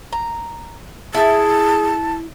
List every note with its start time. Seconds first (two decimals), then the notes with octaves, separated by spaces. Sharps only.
0.12 A#5
1.14 E4 G#4 A5